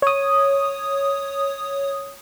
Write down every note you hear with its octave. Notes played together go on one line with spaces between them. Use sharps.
C#5 D#6